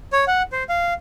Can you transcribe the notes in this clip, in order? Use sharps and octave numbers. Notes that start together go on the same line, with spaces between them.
C#5
F#5
C5
F5